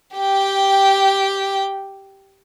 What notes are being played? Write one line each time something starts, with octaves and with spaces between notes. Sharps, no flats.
G4 G5